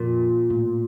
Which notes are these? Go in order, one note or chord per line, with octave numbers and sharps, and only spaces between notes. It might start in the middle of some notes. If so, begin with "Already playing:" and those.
Already playing: F2 A#2
A2